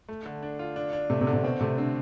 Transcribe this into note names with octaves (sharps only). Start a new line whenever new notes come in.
A3
D3
D4
F4
D4
D4
C3 A3
C3
D3
C3
B2 C4
C3 A3
D3 C4